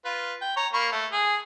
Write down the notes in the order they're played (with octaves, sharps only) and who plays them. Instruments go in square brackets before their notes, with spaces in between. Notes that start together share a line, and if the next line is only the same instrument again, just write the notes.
[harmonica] F4 B4
G5
C#5 A#5
A#3 B5 C#6
A3
G#4